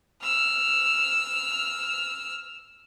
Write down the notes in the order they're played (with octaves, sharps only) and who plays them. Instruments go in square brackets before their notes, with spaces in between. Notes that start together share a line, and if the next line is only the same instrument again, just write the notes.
[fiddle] E6 F6